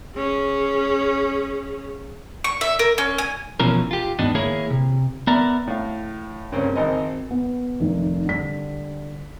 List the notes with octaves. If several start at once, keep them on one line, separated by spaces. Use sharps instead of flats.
C#4 G#4
C#6
E5
A#4
C#4
G#5
B1 B2 E3 F3 C#4 A#4
F4 G4
D#2 G#2 B3 D4 D#4
D#3 A#3 E4 G#4 A#4 C#5
C3
B3 A#4 D5 E5 A#5
A2 F5
G2 C#3 A#3 C4 C#4
G#1 C4 A#4 D#5
B3
F1 D#3
D3 G3 B6